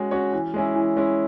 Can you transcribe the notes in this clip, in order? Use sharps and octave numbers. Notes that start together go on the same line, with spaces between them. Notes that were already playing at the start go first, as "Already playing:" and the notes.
Already playing: G#3 C#4 F#4 C#5
C#4 F#4 C#5
E3
G#3 C#4 E4
E3
G#3 C#4 E4